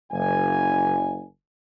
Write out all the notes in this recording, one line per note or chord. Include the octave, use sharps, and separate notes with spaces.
F#1 G#5